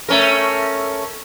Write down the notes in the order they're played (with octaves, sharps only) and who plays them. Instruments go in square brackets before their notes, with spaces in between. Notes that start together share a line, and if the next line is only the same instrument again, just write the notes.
[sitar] A3 C#4 A#4